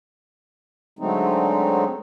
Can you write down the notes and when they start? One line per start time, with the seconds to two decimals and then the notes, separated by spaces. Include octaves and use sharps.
0.99 D3 F#3 G#3 A3 C4 D#4